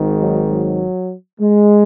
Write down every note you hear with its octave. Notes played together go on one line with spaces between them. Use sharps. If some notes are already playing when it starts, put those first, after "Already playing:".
Already playing: G#1 G#2 D#3
F#3
F#3
G#3